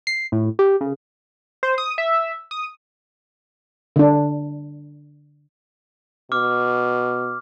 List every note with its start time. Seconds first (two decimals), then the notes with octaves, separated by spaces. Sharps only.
0.07 C7
0.32 A2
0.59 G4
0.81 C#3
1.63 C5
1.78 D#6
1.98 E5
2.51 D#6
3.96 D3 D4
6.32 B2 D6 F6